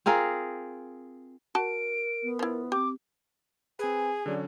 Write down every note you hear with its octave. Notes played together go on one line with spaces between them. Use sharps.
C4 F4 G#4 A#4
F#4 A#4 A5 D7
B3
F3 E4
C4 G4 D6
C4 G#4 B4 G#5
D3 F#3 C#4 D5